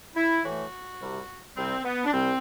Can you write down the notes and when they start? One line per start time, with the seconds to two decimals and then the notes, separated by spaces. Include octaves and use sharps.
0.15 E4
0.44 A2 E3 A3 F#4
1.00 C2 C3 G3
1.55 C2 C3 G3 C4
1.84 B3
2.05 D4
2.12 C2 C3 G3 C4